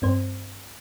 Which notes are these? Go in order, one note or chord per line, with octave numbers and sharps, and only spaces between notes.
G2 C4 C5